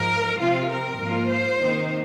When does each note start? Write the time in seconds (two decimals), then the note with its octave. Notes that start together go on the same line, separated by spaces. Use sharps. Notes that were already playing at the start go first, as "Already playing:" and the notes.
Already playing: G#2 F3 G#3 A#4
0.39 C3 F3 C4 F4
0.69 A#4
0.99 G#2 F3 A#3 F4
1.29 C5
1.58 C3 D#3 A#3 D#4